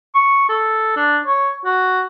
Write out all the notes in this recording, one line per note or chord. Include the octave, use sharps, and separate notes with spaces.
C#6
A4
D4
C#5
F#4